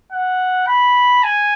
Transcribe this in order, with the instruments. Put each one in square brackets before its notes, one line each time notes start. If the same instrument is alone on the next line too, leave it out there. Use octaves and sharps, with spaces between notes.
[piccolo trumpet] F#5
B5
G#5